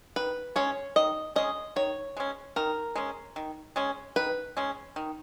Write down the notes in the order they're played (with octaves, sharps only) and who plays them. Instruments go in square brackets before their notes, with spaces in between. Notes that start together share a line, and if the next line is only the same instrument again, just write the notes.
[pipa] D#3 [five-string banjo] B4
[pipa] G#3 C#4 [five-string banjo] C#5
[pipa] D#3 [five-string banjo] D#5
[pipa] G#3 C#4 [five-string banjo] D#5
[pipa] D#3 [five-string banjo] C#5
[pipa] G#3 C#4
[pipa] D#3 [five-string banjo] A#4
[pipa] G#3 C#4
D#3
G#3 C#4
[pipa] D#3 [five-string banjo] B4
[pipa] G#3 C#4
D#3